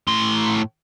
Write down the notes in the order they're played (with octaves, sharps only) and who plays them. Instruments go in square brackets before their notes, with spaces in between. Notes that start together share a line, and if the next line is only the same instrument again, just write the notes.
[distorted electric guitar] A2 C6